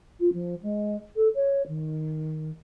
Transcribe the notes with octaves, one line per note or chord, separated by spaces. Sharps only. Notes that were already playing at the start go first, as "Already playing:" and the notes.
F4
F3
G#3
A4
C#5
D#3